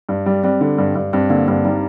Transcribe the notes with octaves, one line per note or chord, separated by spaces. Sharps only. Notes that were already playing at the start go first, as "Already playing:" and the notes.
G2
G3
G3 C4
D3
G2
G2
G2 C4
D3 A#3
G2 C4
G3 D#4